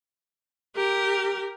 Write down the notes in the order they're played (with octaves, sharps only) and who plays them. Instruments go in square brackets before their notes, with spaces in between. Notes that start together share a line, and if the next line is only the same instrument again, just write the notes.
[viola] G4 A#4